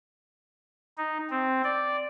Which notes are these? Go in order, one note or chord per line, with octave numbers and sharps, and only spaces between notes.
D#4
C4
D5